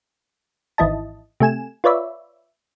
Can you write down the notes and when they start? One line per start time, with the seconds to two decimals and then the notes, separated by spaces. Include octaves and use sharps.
0.78 G#1 E3 E4 D#5 A5
1.40 C3 A3 G#5 E7
1.84 F4 B4 C#5 D5 E5